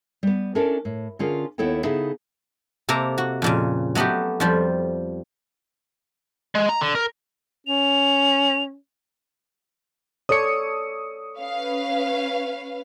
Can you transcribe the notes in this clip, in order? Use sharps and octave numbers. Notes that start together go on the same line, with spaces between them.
G3 B3
C#4 D4 E4 A4 A#4 D5
A2
D3 C#4 F4 G#4 A#4
D#2 B3 E4 A4 C#5 G5
C#3 B3 D#4 E4 G#4 A4
C3 A#3 A4 A5 A#5
F#4
F2 A#2 C#3
F#3 A3 B3 F#4 G4
F2 F3 G3
G#3
A#5
D3
A#4
C#4 F7
A4 C#5 D5 D#6 C#7
C#4 B4 F5